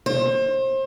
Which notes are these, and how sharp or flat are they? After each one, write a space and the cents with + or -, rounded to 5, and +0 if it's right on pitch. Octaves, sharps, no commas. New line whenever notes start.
C5 +35